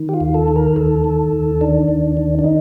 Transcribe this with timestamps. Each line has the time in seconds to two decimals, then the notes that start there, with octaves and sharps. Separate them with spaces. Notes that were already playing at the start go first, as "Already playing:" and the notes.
Already playing: D#3
0.09 G4
0.14 F4
0.21 D#2
0.34 A4
0.48 D#3
0.56 A#4
0.76 D#2 A4
1.04 D#3
1.32 D#2
1.61 D#3 D4
1.88 D#2
2.17 D#3
2.39 D4
2.44 D#4